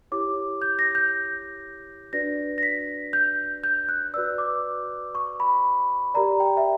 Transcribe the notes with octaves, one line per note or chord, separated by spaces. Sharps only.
E4 G4 C#5 D6
G6
A#6
G6
D4 F#4 B4 D5 A#6
A#6
B6
G6
G6
F#6
F#4 B4 D5 E6
D6
C#6
B5
G4 A#4 D5 A#5
G5
E5